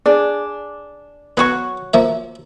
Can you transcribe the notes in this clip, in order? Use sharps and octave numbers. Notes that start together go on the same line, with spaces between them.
D4 G#4 D5
F#3 B3 F#4 G#5 C#6
F3 A#3 E5